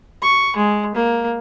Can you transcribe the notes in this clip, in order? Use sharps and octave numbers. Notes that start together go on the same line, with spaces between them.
C#6
G#3
A#3